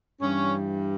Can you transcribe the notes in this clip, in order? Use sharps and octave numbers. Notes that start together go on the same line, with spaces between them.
G2 E3 G3 C#4